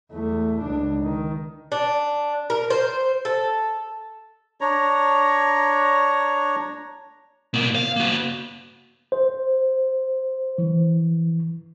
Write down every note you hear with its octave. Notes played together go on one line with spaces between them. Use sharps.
E2 A3
C#2 D4
D#3
D4
A#4
C5
A4
D4 C#5 A#5
B2 A#3
F5
A#3 F#4
C5
E3